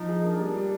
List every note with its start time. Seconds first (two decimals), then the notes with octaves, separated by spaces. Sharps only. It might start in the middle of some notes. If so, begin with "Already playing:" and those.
Already playing: F3 D#4
0.08 G#4
0.24 A#3 D4
0.39 G3
0.55 G3